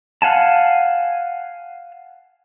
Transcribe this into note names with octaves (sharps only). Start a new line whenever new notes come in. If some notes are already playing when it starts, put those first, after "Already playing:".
F5 F#5 G#5 A5